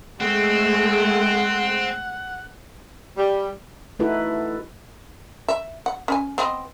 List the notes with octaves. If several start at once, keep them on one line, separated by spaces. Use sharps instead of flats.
G#3 A3 C4 F#5
G3
A3 D#4 E4 F#4 A4 B4
E5
F#5
C#4 G#5
B3 C4 D#5